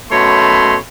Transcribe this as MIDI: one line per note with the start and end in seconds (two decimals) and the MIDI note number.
0.11 0.75 42
0.11 0.75 47
0.11 0.75 57
0.11 0.75 73
0.11 0.75 83
0.11 0.75 84